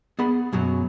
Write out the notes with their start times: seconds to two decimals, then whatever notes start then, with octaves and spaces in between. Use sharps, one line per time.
0.19 B3 G#4 F#5 B5
0.53 F#2 B2 F#3